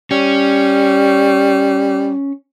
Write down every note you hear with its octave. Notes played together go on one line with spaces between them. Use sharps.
G3 C#4